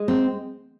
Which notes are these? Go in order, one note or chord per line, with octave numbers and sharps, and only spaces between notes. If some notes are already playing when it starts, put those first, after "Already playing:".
Already playing: G#3
C4